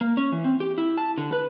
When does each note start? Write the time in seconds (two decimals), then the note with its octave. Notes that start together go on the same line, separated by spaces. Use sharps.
0.01 A#3
0.17 C#4
0.32 E3
0.44 C4
0.60 G4
0.78 E4
0.97 A5
1.18 D3
1.33 B4